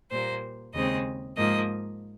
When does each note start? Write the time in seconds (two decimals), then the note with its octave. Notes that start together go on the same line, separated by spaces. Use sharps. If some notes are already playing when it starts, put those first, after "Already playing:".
0.10 A#2 G3 A#3 C5
0.73 D#2 C#3 G#3 C4 D#5
1.36 G#2 F3 A#3 D#5